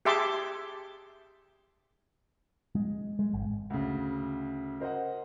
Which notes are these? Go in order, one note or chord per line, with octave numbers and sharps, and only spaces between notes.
G4 G#4 E5 A5 C6 D6
G#3
G#3
G#1
D2 C#3
A#4 C5 D#5 F#5